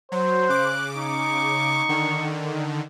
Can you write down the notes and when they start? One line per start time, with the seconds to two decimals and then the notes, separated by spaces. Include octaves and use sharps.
0.12 F#3 C5
0.49 C#3 D6 F#6
0.97 D#4 C#6
1.89 D3 D#3